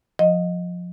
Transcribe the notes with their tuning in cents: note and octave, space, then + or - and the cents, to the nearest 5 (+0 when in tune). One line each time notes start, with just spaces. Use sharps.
F3 +25 D#5 +0